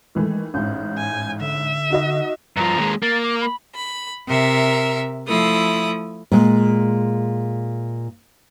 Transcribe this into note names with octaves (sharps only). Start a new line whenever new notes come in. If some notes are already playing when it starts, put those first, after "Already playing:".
D#3 E3 G#3 A3
A1 G#2 G6
G#5
D3 E5
D#4 F#4 D#5
G2 F3 A#5
D#2 G#3
A#3 A6
D6
B5
B5
C3 A#4 E5
F3 A3 E4 D#6
A#2 G#3